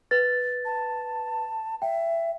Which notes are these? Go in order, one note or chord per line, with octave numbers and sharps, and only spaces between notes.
B4 A6
A5
E5 G5